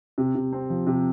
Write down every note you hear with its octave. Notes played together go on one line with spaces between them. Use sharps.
C3
C3
C4
F3
C3